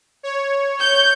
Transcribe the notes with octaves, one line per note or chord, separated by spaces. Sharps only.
C#5
G6